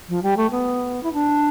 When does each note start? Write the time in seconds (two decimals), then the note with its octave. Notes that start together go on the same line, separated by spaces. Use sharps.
0.08 F3
0.22 G3
0.36 A3
0.50 B3
1.03 E4
1.13 D4